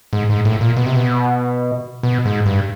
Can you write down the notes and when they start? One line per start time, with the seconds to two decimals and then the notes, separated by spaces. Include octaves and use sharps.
0.13 G#2
0.30 G#2
0.45 A2
0.61 A#2
0.77 B2
0.86 C3
0.96 B2
2.03 B2
2.25 G#2
2.46 G2